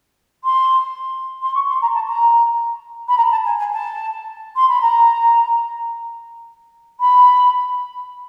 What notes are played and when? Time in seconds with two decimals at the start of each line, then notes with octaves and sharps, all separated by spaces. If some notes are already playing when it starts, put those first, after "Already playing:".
0.44 C6
1.41 C6
1.54 C#6
1.68 C6
1.81 A#5
1.94 A5
2.07 A#5
3.08 B5
3.17 A#5
3.30 A5
3.45 G#5
3.58 G#5
3.72 A5
4.55 C6
4.68 B5
4.81 A#5
7.00 B5